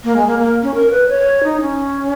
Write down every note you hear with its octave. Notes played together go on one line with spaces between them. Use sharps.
A#3
G#3
A#3
A#3
C#4
A#4
B4
C#5
D#4
C#4